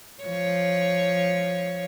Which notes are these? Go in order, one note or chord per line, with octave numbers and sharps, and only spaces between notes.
F3 C#5